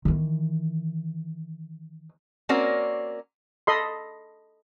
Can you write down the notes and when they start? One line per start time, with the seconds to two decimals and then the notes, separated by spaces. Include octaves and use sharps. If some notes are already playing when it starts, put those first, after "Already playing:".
0.05 D#3 E3
2.49 A#3 C4 C#4 F#4 A#4 D5
3.67 A4 D#5 B5 C6